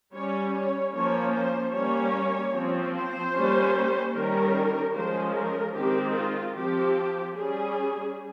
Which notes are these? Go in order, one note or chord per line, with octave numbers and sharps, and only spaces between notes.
G3 C#4 C#5
C#5
F3 A#3 C#4 C#5
C5
G3 A#3 C#4 C#5
F3 C4
C5
G3 A#3 C#4
D#3 G3 C#4 A#4
F3 G#3 C#4 C5
A#4
D#3 G#3 C4 G4
F4
F3 C4 G4
G3 C#4 G#4